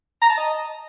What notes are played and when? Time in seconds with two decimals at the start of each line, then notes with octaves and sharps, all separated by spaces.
0.22 A#5
0.30 A5
0.37 D#5